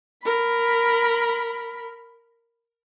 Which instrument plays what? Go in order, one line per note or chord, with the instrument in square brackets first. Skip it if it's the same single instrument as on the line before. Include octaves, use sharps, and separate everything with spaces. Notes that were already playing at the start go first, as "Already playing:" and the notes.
[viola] A#4 B5